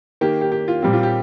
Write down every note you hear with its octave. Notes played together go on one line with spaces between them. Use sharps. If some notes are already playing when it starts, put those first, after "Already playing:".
D#3 A#3 G4
G4
G4
F4
A#2 G3 C4 G4
F4
G4